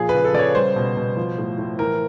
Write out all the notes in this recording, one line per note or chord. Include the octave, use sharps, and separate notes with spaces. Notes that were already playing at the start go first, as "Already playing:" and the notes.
Already playing: A#2 F3 G#4
B4
C#3
A4
C#3 C#5 D5
G3 C5
B2
B2
F3
A2
A2
E3 A#4